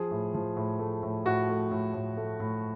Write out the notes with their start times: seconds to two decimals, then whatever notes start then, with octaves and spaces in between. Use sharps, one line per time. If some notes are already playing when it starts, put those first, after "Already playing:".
Already playing: F3 G#4
0.11 A2
0.34 F3
0.57 A2
0.79 A3
1.03 A2
1.25 A2 F#4
1.49 A3
1.72 A2
1.94 A2
2.17 A3
2.40 A2